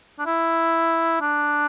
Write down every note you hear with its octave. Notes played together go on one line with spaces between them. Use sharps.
D4
E4
D4